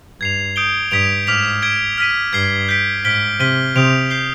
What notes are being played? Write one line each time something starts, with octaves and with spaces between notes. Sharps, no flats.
G2 G#6 C7 F7
D#6 G6 D7 G7
G2 D#6 G#6 B6 D7 F7
G#2 D6 F6 B6 F7
G#6 D7 G7
F6 B6 D#7
G2 G#6 C7 G7
G6 B6 D7
G#2 F6 B6 D7 G7
C3 F6 B6 D#7 G7
C3 D#6 G6 D7 F7
G6 C7 G7